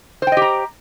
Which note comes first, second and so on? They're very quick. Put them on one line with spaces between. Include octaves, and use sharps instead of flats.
C5 G5 D#5 G4 A#5